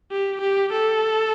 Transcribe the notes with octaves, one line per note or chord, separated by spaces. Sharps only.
G4
G4
A4